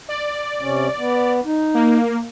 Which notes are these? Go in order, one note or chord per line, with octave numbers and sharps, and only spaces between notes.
D5
C3 C#4
B3
D#4
A#3